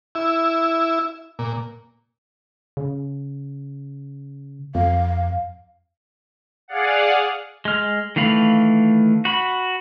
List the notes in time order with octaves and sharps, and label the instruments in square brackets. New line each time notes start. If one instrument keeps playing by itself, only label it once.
[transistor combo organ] E4
A#2
[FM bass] C#3
[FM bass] F2 [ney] F5
[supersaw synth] G#4 D5 F5 F#5
[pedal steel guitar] G#3 F6
D#3 E3 A3 F5 B5
F#4 B5